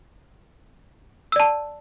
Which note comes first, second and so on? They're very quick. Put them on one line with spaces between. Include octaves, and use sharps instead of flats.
E6 D5 A5